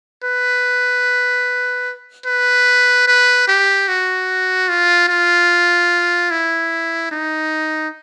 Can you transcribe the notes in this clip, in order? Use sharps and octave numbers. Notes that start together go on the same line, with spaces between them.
B4
B4
B4
G4
F#4
F4
F4
E4
D#4